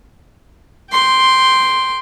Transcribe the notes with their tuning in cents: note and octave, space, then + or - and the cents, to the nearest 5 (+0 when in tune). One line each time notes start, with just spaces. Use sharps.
G5 +0 C6 +0